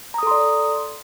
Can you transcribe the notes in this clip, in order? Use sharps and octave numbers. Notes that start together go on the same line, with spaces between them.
A4 D5 A#5 C6 D#6